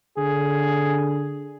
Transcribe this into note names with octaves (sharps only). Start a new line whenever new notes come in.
D3 G#4